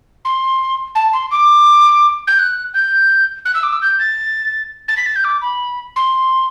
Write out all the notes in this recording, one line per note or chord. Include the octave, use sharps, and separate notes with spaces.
C6
A5
C6
D6
G6
F#6
G6
F#6
E6
D6
E6
G6
A6
A6
B6
A6
G6
D6
B5
C6